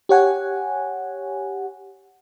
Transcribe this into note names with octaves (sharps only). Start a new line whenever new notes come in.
G4 C#5 F#5 G#5